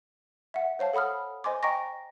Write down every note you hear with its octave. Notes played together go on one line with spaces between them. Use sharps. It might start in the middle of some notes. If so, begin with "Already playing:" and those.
E5 F#5
C5 C#5 F5 A5
A4 F#5 B5 D#6 F6
C5 D#5 G#5 C6 D6
D#5 G5 A#5 C#6 A#6